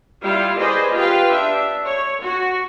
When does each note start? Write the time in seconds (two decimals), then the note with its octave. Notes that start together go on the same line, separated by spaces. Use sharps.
0.22 G3 E4 F4 F5
0.58 G#4 B4 C5 D5 D#5
0.94 F4 G4 B4 F5 G5
1.32 D4 E5
1.84 C#5
2.22 F#4